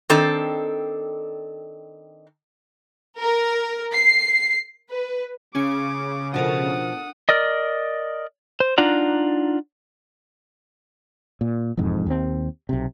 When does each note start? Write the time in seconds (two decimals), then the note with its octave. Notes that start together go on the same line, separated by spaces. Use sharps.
0.10 D#3 C4 D4 A4
3.17 A#4
3.94 C7
4.89 B4
5.55 C#3 C#4 G#4 D6 G#6
6.34 B2 F3 D4 A4 A#4 F#5 D#6
7.29 A#4 D5 D#5
8.60 C5
8.78 D4 D#4 F4 D5 F#5 A#5
11.41 A#2
11.77 E1 F2 G#2
12.06 D#2 G#3 C4
12.69 B1 C3